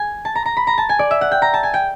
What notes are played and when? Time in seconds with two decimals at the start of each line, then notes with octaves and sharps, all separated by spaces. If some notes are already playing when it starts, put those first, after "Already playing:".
Already playing: G#5
0.25 A5
0.35 A#5
0.46 A#5
0.57 B5
0.67 A#5
0.78 A5
0.89 G#5
0.99 D5
1.11 E5
1.21 F#5
1.32 G5
1.42 A#5
1.54 A5
1.63 G#5
1.74 G5